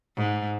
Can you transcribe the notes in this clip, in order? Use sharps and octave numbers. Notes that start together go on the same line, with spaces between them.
G#2